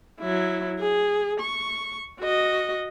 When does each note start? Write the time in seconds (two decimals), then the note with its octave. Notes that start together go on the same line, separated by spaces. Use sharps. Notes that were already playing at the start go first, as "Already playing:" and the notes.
0.20 F#3 E4
0.80 G#4
1.40 C#6
2.20 F#4 D#5